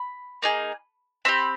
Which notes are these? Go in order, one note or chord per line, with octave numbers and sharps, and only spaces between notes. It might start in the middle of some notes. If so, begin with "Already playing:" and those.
Already playing: B5
A#3 D#4 G#4
C4 E4 G4 B5